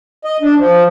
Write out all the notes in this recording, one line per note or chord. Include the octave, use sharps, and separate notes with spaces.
D#5
D4
F3